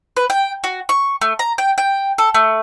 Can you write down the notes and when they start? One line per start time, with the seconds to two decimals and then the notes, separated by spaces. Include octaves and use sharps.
0.17 B4
0.30 G5
0.64 F#4
0.89 C#6
1.21 A3
1.39 A#5
1.58 G5
1.78 G5
2.18 A4
2.34 A3